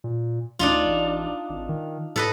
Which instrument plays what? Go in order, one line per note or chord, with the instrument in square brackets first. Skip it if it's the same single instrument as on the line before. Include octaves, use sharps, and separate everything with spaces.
[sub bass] A#2
[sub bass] D2 [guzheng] D4 D#4 F4
[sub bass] A1
G#1
D#3
[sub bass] A2 [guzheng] A4 B4 D#5